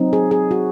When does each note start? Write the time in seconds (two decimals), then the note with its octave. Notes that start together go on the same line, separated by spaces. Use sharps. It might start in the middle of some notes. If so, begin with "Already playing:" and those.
Already playing: F#3 C4 D#4
0.13 G#4
0.31 G#4
0.51 F#4